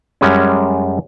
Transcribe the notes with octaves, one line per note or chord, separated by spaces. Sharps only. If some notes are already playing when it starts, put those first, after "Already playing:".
F#2 G3 G#3 C#4